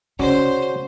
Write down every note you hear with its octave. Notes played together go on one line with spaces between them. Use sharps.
C#3 C#4 F#4 C5 D5